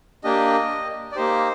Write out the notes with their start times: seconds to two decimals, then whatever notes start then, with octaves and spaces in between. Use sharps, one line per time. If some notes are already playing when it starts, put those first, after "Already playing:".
0.24 A#3 D4 G4 D#5
1.12 D5
1.16 A#3 D#4 G4 C5